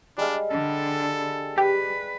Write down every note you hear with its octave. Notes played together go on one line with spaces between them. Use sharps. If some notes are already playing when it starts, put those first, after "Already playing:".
G3 G#3 D4 F5
D3 A4
G4 B4